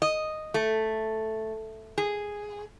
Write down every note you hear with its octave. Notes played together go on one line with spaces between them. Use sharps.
D#5
A3
G#4